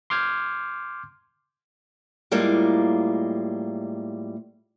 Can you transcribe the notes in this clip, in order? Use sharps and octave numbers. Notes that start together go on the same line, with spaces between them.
C6 D6 F6 G6 G#6
A2 G3 G#3 A#3 F4